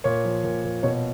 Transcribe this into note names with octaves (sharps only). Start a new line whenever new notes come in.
A#2 C#5
F3
A#2
A#2
B2 C#5